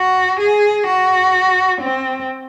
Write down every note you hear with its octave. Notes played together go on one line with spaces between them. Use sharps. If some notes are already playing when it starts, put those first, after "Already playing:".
Already playing: F#4
G#4
F#4
C4